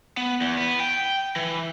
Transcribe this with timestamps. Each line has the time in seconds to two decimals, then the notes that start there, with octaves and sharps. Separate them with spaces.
0.17 B3
0.41 E2
0.57 B3
0.80 G5
1.36 E3